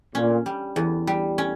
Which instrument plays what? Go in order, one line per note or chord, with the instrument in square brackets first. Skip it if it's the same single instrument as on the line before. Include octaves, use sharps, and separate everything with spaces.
[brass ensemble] A#2 [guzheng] C#4
[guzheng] G3
E2
G3
C#4